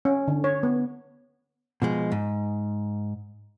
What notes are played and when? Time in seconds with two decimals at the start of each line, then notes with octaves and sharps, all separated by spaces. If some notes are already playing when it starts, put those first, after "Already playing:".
0.05 C#4
0.28 D3
0.44 C#5
0.63 B3
1.82 B2 F3 G#3
2.12 G#2